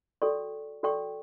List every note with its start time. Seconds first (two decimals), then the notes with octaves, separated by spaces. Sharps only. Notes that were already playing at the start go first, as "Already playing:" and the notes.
0.22 F#4 A4 D5 G5 C#6
0.83 F#4 A4 D5 G5 C#6